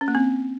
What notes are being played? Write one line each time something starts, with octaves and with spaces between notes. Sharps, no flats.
C#4
A#3
C4